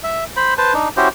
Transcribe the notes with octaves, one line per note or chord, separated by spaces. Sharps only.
E5
C5 B5
B4 C5 A5
D4 D#4
C#4 E4 F#4 G4 C5